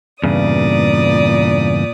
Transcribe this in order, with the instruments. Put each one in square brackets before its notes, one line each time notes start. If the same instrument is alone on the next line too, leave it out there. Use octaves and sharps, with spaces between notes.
[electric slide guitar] E2 G2 C#3 [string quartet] A#2 D5 D#6